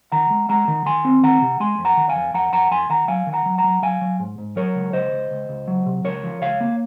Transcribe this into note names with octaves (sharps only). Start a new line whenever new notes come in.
D#3 F#5 A#5
G#3
G#3 F#5 A#5
D#3
D#3 G#5 C6
C4
D#3 F#5 A#5
C3
G#3 G#5 C6
F2
F#5 A#5
D#3
F5 G#5
F2
F2 F#5 A#5
F2 F#5 A#5
F2 G#5 C6
D#3 F#5 A#5
F#3 F5 G#5
D#3
F#5 A#5
F#3
F#5 A#5
F#3
F#3 F5 G#5
F#3
G#2
G#2
F#3 A#4 C#5
C#2
C#2 C5 D#5
C#2
C#2
C#2
F#3
C3
C#2 A#4 C#5
F3
C#2 C#5 F5
A#3